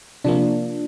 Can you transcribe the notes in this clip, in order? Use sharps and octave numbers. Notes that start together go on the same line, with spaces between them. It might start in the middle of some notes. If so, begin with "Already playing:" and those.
C3 F3 A#3 D4